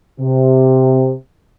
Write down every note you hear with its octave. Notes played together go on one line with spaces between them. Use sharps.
C3